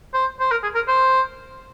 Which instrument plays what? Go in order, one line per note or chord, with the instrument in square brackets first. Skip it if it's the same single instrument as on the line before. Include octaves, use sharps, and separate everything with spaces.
[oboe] C5
C5
A#4
G#4
A#4
C5